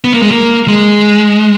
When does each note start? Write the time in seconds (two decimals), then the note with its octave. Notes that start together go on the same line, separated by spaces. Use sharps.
0.04 B3
0.14 A#3
0.22 G#3
0.31 A#3
0.68 G#3